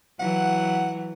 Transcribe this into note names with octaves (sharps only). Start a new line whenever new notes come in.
E3 F#3 F#5